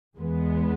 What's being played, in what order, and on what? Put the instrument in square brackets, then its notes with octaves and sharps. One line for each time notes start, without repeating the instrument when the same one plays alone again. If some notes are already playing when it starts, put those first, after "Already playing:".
[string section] E2 E3 G#3 B3